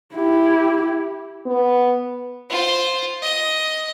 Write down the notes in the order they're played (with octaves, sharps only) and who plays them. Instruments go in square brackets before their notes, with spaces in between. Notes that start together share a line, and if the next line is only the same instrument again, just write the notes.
[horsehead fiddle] E4 G4
[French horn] B3
[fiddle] F4 C5
D#5